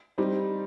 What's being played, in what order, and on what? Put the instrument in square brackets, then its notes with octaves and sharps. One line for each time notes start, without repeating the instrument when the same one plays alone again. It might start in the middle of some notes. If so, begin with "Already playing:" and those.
[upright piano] G3 C4 D#4 G4